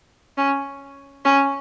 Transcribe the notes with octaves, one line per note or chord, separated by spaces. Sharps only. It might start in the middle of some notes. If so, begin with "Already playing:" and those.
C#4
C#4